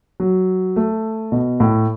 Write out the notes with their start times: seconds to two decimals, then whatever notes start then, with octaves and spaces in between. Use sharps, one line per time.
0.20 F#3
0.76 A3
1.32 B2
1.60 A2